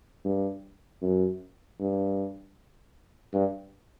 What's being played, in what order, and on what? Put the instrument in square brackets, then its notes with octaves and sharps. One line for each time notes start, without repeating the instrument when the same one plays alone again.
[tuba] G2
F#2
G2
G2